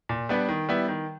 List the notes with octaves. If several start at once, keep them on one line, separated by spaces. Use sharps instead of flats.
A#2
G3 B3 D4
D#3
G3 B3 E4
D#3